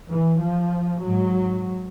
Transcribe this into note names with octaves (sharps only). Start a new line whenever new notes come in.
E3
F3
G#2 F#3